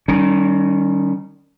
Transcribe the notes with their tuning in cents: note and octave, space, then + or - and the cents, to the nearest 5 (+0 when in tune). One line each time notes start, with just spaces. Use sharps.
D#3 -25 G3 -20 C#4 +15